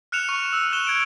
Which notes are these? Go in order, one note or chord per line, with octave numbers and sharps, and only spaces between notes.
F6 F#6 C#7 E7 F7
C#6
E6
F#6 E7 G7
G#6 D7 E7